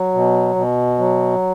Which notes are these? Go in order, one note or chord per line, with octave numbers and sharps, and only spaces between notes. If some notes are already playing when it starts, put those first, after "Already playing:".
Already playing: F#3
B2
B2
F#3